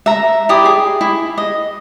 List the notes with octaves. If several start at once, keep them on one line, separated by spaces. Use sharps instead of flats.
E5 A#5
E4 G4 D5 D#6
G#4
E4
D#5